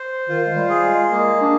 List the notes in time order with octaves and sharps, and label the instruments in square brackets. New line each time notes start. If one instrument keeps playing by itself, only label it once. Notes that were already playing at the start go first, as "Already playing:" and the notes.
Already playing: [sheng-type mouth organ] C5
[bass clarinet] D#3 [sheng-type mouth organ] F4
[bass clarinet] G#3
G3
[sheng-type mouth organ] G#4
[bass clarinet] G#3
[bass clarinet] G#3 [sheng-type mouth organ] A#3
[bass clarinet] D4